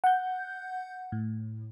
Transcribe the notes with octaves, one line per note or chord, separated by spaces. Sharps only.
F#5 G6
A2